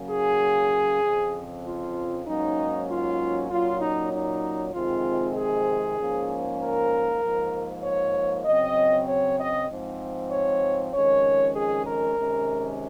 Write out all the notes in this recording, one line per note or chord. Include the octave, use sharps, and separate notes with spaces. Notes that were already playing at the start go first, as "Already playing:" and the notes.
Already playing: C#3 F#3 A#3 C#4
G#4
F2 C#3 F3 C4
F4
G#2 F#3 A#3 C#4 D#4
F4
A#2 F#3 C#4 F4
D#4
D#4
F2 C3 D#3 G#3 C4 F4
G#4
G#2 F3 A#3 C#4
A#4
G#2 F3 A#3
C#5
C#3 F#3 C4 D#5
C#5
D#5
G#2 F3 C4
C#5
F2 D#3 G#3 C#4 C#5
G#4
A#4
C3 D#3 G#3 C#4